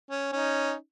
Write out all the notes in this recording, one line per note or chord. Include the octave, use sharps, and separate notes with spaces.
C#4
C#4 D#4